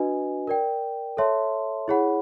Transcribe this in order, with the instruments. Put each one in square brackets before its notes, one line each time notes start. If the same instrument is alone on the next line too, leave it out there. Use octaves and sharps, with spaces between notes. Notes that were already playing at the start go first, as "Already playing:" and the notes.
Already playing: [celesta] D4 F#4 B4 D#5 G#5
A#4 D5 G5
A4 C#5 E5 A5 C6
E4 G#4 C#5 F#5 B5